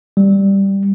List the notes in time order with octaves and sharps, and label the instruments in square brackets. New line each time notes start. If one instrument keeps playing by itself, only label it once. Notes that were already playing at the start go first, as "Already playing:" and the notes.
[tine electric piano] G3